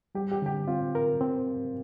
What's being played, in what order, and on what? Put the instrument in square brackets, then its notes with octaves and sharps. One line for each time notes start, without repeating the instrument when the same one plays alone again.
[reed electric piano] G3 [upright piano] G4
[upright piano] G4
[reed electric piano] D3 [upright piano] G4
[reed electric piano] C4 [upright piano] F4
[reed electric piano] A#4
C4